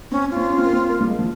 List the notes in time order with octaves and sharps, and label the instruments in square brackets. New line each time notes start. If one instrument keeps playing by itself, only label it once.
[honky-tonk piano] C4 [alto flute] C#4
[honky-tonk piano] C#4
[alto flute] F4
[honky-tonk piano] C4
C#4
C4
A#3
C4
A#3
G3
G#3
F3